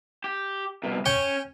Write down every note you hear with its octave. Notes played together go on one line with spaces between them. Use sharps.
G4
C2 B2
C#4 C#5 G5